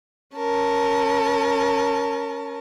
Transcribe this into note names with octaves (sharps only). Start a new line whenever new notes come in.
C#4 A#4 A5